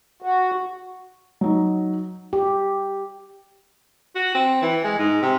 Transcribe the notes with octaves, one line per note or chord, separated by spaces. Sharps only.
F#4
F#3 D#4
G4
F#4
C4
E3
G#3
G#2
C3